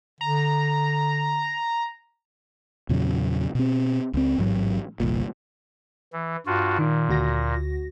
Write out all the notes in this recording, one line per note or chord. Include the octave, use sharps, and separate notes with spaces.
D3 A#5
E2 A#2 C#3 F#3
B2 C4
C#2 C4
A1 G#2 F#3
G1 C2 A#2
E3
G2 F4 F#4
A#2 D#3
D2 F#4 A#6